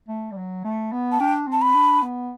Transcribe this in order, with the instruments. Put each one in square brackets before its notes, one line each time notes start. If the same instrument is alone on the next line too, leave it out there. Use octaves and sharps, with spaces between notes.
[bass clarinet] A3
G3
F#3
A3
B3
[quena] A5
[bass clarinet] D4 [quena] G5
[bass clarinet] C4 [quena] A5
[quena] B5
[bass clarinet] D4
B3